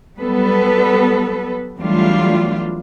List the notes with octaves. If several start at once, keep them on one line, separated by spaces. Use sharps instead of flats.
F#3 G3 B3 A4 B4
E2 F#3 G3 A3 D4 F4